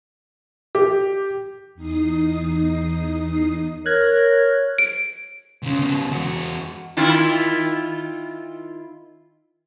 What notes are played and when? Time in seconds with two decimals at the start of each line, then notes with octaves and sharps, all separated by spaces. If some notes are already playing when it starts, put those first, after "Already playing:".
0.75 G4
1.75 E2 D#4 D#6 C7
3.86 A#4 C#5 F#6 G#6
4.78 D7
5.63 C#2 C#3
5.79 C#3 B3
6.10 E2 F#4
6.97 D#3 E4 F4